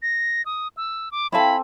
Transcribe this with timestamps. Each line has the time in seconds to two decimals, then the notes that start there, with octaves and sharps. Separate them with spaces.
0.02 A#6
0.46 D#6
0.77 E6
1.12 D6
1.32 C4 E4 A4 F5 G#5 A5 B5